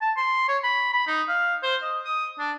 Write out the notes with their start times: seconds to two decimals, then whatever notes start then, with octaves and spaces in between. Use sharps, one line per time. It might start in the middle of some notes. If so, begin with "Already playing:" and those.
0.01 A5
0.17 C6
0.48 C#5
0.64 B5
0.93 B5
1.07 D#4
1.28 F5
1.63 C5
1.82 D#5
2.05 D#6
2.39 D4